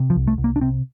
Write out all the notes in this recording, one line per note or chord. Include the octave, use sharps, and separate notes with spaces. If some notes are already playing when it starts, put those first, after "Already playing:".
Already playing: C3
F3
C2
A3
C2
A#3
D4
C3 C4